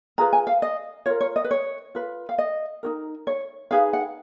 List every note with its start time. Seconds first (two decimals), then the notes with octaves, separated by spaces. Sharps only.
0.18 F4 G#4 B4 A#5
0.33 G#5
0.47 F5
0.62 D#5
1.06 F4 A#4 C#5
1.21 C#5
1.36 D#5
1.44 B4
1.51 C#5
1.95 F4 B4
2.29 F5
2.38 D#5
2.83 D#4 F#4 A#4
3.27 C#5
3.71 D#4 G#4 B4 F5
3.93 F#5